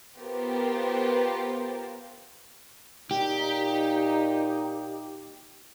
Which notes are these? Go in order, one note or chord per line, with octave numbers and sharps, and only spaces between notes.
B3 F4 G4 A#4 C5
A#2 D#4 G4